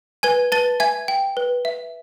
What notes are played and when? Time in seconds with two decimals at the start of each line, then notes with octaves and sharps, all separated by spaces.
0.23 B4 G#5 G#6
0.52 B4 A5 A6
0.80 E5 G#5 G#6
1.08 G5
1.37 B4
1.65 E5